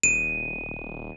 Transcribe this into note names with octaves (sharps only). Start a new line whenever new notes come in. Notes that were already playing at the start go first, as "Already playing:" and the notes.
D#1 D#7